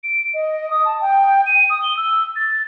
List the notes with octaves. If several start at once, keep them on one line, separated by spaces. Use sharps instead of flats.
D7
D#5
D#6
A5
G5
D#7
D#6
G7
E6
A6